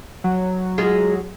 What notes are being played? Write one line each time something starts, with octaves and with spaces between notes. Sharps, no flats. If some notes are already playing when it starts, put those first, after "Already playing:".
F#3
G#3 F4 G#4